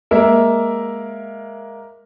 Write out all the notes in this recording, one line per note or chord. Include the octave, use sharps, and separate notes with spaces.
G#3 A#3 A#4 E5